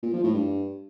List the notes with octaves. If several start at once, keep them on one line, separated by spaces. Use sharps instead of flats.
A#2
F3
A2
G2